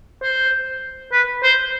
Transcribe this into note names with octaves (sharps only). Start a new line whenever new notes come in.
C5
B4
C5